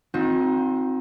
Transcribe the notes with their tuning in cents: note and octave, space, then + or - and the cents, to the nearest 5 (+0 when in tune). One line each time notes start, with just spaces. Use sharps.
C4 +0 D#4 +20 F#4 -45